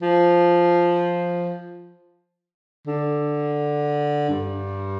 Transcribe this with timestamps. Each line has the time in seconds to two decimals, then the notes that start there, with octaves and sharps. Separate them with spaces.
0.02 F3
2.87 D3
4.30 G2